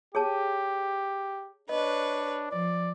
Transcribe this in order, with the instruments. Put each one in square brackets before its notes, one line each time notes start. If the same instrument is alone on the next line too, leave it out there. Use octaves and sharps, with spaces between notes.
[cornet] G4 [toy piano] G#4 C#5 A5
[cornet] D4 [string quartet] B4 C#5 [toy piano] D#5
[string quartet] F3 [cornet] D5